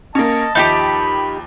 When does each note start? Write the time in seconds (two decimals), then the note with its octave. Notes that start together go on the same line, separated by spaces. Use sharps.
0.15 A#3 C#4 D#5 A5
0.55 D#2 F3 D#4 F4 G4 B5 B6